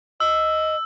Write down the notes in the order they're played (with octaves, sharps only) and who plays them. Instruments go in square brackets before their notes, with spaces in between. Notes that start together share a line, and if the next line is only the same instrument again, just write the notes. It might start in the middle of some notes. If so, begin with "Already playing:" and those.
[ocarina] D#5 [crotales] E6